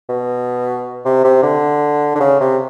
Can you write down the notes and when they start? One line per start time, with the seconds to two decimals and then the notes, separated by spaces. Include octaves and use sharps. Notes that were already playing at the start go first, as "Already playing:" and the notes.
0.09 B2
1.05 C3
1.24 C3
1.43 D3
2.15 D3
2.20 C#3
2.40 C3